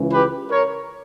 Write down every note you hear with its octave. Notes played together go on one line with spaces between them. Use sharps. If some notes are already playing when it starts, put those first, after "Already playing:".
Already playing: C#2 C#3 E3
G4 B4
A#4 C#5